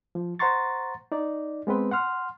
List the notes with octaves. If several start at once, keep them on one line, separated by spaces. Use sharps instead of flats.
F3
C5 F#5 A#5 C6 C#6 A6
D#4 D5
G#3 B3 C4 B4
F#5 C6 F6